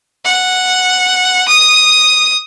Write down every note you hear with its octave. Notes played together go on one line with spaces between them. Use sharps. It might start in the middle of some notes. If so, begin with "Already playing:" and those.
F#5
D#6